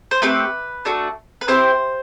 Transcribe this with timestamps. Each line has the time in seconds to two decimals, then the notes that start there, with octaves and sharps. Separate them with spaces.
0.11 C5
0.22 A3 C4 G4 B4
0.85 A3 D4 F#4 A4
1.41 B4
1.48 C4 E4 G4 C5